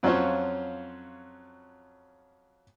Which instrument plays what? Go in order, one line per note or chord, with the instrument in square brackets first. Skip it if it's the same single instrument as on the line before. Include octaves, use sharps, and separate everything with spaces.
[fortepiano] F2 F#3 C#4 F4 C5 C#5